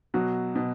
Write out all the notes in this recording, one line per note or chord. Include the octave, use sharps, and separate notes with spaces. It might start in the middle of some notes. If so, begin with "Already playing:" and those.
B2 F#3 F#4
B2